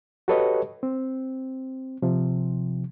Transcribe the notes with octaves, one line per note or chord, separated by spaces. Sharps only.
F#4 G4 A4 B4 C#5 D#5
C4
C3 F3